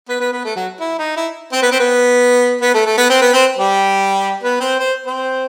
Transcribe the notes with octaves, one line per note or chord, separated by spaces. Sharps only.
B3 B4
B3 B4
B3 B4
A3 A4
F#3 F#4
E4
D#4
E4
C4 C5
B3 B4
C4 C5
B3 B4
B3 B4
A3 A4
A3 A4
B3 B4
C4 C5
B3 B4
C4 C5
G3 G4
B3 B4
C4 C5
C5
C4 C5